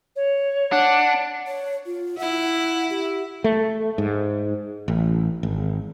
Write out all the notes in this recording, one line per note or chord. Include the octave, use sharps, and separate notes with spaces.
C#5
D4 F#5
C#5
F4
E4 F#5
G4
A3
G#2
A1
G#1